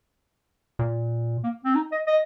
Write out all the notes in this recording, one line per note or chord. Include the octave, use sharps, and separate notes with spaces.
A#2
A#3
C4
D#4
D#5
D#5